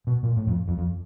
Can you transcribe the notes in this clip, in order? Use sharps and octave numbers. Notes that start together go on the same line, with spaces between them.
B2
A#2
A2
F2
F2
F2